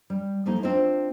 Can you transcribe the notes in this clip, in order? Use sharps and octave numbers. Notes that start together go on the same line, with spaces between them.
G3
F3 G3 A3 A#3 D#4
C4 D4 F4 C5 D#5